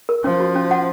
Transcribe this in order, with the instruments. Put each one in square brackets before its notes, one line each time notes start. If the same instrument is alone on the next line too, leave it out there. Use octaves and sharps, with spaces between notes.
[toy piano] A#4
[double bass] F3 [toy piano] C#4
[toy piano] F#4
C#4
F#5